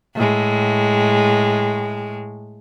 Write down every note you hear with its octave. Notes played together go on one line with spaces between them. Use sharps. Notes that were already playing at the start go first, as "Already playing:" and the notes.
A2 G#3